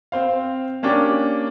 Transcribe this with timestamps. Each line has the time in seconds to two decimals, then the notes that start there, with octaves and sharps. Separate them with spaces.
0.12 C4 C5 F5
0.83 A#3 C#4 D4 G4